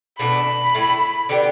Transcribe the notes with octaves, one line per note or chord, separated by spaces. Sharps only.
B2 A3 D4 B5
A2 A3 E4
D3 B3 G4